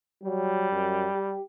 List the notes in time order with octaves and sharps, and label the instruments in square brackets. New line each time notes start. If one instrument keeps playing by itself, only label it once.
[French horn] F#3 [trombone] G3
[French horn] F#2
G4